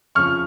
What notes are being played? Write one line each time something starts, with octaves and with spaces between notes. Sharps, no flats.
F2 C#3 F3 C#6 F6